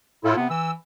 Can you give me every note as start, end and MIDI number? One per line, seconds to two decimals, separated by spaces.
0.24 0.33 45
0.24 0.36 64
0.24 0.36 65
0.24 0.36 69
0.37 0.49 48
0.37 0.45 59
0.50 0.72 52
0.50 0.71 88